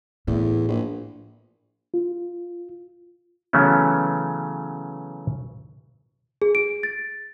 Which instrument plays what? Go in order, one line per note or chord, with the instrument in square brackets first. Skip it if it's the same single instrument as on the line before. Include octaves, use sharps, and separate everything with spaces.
[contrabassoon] E2 [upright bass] A2
[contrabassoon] A#1
[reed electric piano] F4
[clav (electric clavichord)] C#3 E3 F#3 A3 B3 C#4
[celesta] G#4
D7
A6